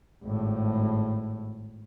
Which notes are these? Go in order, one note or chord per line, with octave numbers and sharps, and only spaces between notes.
G#1 A2